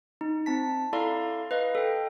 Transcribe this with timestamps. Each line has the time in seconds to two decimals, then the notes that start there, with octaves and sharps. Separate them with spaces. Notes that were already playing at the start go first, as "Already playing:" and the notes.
0.21 D#4
0.46 C4 A5 B6
0.93 E4 A4 D5 F5 A#5 C6
1.51 B4 D#5 F5
1.75 A4 G5